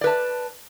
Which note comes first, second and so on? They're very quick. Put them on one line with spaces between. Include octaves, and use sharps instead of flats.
D5 B4 A5